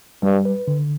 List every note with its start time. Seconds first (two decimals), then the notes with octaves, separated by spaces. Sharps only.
0.23 G2 G3
0.45 B4
0.68 D3